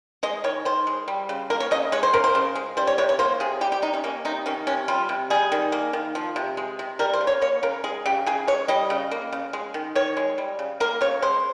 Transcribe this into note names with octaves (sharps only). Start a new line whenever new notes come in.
G#3 D#5
D#3 C#5
D#3 C5
G#3
G3
C#3
A#3 A#4
C#5
C#3 D#5
G#3 C#5
C5
C#3 A#4
C5
C#3
G#3
G3 C5
C#5
C3 C#5
C#5
A#3 C5
C3 G#4
G3 G4
G4
C3 D#4
C#4
A#3 C#4
C3 D#4
D#3 C#4
C3 C#4
G3 F4
C3
G3 G#4
D#3
A#3
D#3
F3
C3
G#3
C3
G3 A#4
C5
C#3
C#5
A#3 C#5
C#3 A#4
G#3 G#4
C#3 G4
C#3 G#4
G#3 C#5
G3 D#5
C#3
A#3
C#3
G#3
D#3
D#3 C#5
G#3
G3
C#3
A#3 A#4
C#3 C#5
G#3 C5